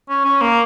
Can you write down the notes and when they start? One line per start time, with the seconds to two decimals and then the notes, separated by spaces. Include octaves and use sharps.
0.09 C#4
0.25 C#4
0.41 A#3